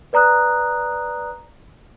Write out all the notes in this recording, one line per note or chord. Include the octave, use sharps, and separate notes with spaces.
B4 D5 A#5 D#6 F#6